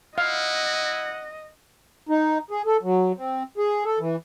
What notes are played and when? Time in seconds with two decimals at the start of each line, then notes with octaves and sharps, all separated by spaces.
0.18 E4 D#5 F5 F#5
2.09 D#4
2.51 G#4
2.66 A4
2.83 F#3
3.17 C4
3.58 G#4
3.85 A4
4.00 E3